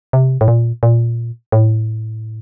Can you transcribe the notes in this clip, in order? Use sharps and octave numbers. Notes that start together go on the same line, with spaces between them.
C3
A2
A#2
A#2
A2